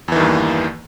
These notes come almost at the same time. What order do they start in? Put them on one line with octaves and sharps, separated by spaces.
E2 E3 D#3 G2 A#3